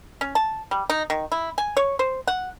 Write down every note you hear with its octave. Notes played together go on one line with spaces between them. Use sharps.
C#4
A5
G3
D#4
D#3
E4
G#5
C#5
C5
F#5